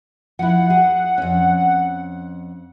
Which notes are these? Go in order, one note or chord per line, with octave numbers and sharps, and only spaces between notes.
F3 E4 F#5
G#4
F2 C#4